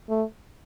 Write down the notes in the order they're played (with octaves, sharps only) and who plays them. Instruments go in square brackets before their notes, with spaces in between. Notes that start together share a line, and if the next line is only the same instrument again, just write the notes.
[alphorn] A3